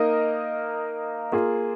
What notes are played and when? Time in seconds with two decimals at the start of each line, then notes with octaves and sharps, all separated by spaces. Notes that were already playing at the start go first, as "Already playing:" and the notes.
Already playing: A#3 D#4 A#4 D#5
1.32 A#3 F4 G#4